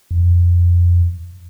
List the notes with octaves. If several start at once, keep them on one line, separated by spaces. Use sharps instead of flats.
F2